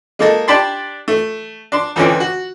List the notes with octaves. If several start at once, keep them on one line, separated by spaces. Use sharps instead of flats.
G#3 A#3 D#4 A4
D4 G4 D5 A5 B5 C6
A3
D4 C6
C#2 D3 E3 C4 C#4 D6
F#4